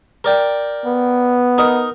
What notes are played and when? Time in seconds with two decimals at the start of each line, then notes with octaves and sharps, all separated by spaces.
0.24 A#4 D5 G5
0.86 B3
1.58 D#4 A#4 D#5